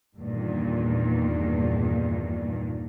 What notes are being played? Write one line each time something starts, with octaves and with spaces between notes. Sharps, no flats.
E2 G2 A#2 D#3